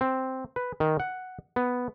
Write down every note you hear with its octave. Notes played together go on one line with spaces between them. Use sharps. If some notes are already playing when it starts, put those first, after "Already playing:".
C4
B4
D#3
F#5
B3